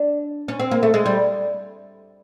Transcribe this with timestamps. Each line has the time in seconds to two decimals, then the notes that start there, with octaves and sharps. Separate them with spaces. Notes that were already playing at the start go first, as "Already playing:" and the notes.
Already playing: D4
0.48 C#4
0.60 C4
0.71 A#3
0.83 A3
0.94 G#3
1.06 G3